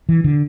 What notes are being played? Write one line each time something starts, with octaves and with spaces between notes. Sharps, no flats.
E3
D3